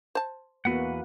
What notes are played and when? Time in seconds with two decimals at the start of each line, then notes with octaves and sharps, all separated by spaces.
0.15 C5 A5
0.65 E2 A#3 B3 F#4 B4 F#5